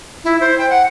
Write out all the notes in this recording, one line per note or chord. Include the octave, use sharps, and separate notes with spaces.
E4
C5
G5
F#5